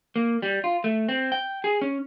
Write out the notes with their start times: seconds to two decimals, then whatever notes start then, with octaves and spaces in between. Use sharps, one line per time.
0.16 A#3
0.42 G3
0.64 F4
0.84 A3
1.09 C4
1.32 G5
1.64 G#4
1.82 C#4